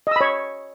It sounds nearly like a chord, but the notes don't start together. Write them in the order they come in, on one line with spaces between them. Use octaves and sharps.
D#5 E6 B5 C#5